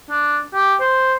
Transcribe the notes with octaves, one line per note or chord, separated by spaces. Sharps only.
D4
G4
C5